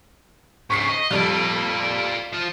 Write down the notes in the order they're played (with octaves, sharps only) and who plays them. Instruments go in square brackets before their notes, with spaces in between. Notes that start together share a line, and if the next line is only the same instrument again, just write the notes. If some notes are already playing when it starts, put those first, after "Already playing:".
[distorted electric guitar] G#2 C#3 [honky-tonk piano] C#6 B6 C7
[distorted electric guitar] D#5
[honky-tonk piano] F2 G3 [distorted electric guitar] F4 D5
[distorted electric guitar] F3 F4